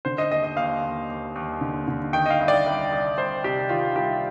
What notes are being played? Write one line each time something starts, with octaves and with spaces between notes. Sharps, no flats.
D3 C5
D#5
D#2 D#5
D#5
D#2 F5
D#2
D#2
D#2
D3
D3
D#3 G5
D#5
F5
C2
D5
C2
C2
C2 C5
C3 G4
D#3 F4
C2 G4